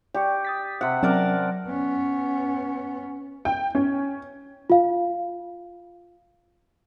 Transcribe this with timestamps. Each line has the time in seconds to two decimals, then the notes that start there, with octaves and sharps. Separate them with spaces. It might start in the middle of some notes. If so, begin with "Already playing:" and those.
0.14 G4 D5 G5 C#6
0.45 D#6 A6 B6
0.81 C3 F#5
1.03 F#3 C4 C#4 A#4 D5 A5
1.68 B3 C#4
3.45 G5
3.75 C#4
4.70 F4 F5